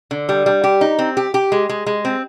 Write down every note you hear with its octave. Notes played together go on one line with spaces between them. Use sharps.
D3
G3
G3
G4
D#4
C4
G4
G4
G#3
G#3
G#3
C4